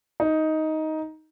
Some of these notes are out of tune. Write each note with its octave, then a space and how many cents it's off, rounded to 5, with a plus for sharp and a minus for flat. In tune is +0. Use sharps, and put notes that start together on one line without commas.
D#4 +10